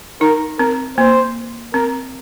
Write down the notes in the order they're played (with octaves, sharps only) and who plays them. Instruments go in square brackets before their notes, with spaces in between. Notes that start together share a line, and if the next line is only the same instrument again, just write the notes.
[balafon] D#4 [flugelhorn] A#4
[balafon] C4 [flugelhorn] A#4
[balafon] A#3 [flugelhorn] C5
[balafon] C4 [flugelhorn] A#4